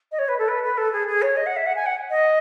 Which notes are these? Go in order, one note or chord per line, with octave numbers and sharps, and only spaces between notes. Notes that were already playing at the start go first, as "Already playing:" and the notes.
D#5
C#5
B4
A4
B4
B4
A4
G#4
G#4
C#5
D#5
F#5
E5
F#5
G#5
F#5
D#5